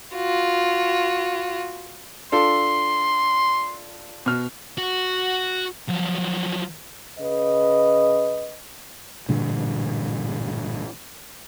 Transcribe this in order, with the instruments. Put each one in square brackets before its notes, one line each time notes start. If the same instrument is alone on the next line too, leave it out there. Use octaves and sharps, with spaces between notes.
[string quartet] F4 F#4
[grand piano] D4 F4 A4 [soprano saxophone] C6
[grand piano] B2 F6
[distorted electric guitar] F#4
F3 F#3
[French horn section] C#3 B4 D#5
[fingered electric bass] A1 G2 A#2 D3